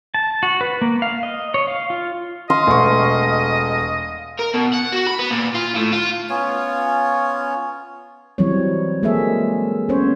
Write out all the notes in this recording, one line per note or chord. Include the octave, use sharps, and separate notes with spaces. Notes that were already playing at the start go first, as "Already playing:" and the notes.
A5
F#4
B4
A#3
F5
D#5
C#5
F5
F4
D#5 F5 C6
E1 A3 C#6
A#4
B2
F#5
F#4
B5
B3
A#2
F4
A2
F4
B3 C#4 F4 C#5
E3 F#3 G3 C4 C#5
G#3 A#3 G#4 A4 E5
B3 C#4 C5 C#5